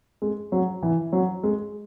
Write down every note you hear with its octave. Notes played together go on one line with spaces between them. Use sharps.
G#3
F#3
E3
F#3
G#3